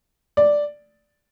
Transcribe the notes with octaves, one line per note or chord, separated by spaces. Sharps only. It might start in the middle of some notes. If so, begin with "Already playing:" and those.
D5